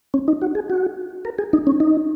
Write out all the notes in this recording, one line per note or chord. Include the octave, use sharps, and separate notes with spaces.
C#4
D#4
F#4
G#4
F#4
A#4
G#4
D#4
C#4
D#4